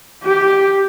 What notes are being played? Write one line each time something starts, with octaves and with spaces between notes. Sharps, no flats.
G4